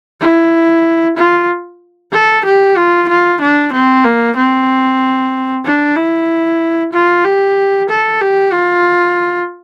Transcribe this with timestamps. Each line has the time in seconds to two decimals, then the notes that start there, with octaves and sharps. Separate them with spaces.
0.20 E4
1.17 F4
2.12 A4
2.45 G4
2.77 F4
3.09 F4
3.41 D4
3.72 C4
4.04 A#3
4.36 C4
5.65 D4
5.96 E4
6.93 F4
7.25 G4
7.89 A4
8.21 G4
8.52 F4